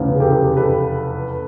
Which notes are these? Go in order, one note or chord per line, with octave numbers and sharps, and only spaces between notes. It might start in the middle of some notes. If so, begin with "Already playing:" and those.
Already playing: F1 E2 C#3
G#4
G4 A4
A4 B4